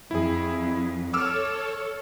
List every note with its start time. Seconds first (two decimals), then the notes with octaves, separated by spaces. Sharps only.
0.11 F2 E4 G#4
1.14 A4 C#5 D6 E6 F6